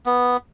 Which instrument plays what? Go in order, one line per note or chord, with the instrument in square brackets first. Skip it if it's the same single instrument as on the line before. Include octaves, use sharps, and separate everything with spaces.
[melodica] B3